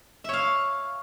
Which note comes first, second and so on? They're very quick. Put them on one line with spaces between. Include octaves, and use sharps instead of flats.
E5 C#5 F5